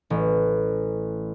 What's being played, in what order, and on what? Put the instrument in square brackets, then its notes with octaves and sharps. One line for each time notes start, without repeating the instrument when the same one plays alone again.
[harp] A1